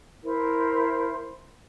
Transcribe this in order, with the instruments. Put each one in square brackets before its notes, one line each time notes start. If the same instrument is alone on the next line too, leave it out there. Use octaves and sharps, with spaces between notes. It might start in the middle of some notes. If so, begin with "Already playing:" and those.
[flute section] E4 A#4 C5